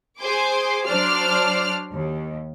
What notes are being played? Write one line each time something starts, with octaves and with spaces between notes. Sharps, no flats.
G#4 C5 G#5 C6 D6
F#3 D4 C5 D5 F6 C7
D#2